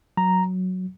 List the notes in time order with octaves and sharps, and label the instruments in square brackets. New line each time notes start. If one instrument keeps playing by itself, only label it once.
[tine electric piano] F#3 A#5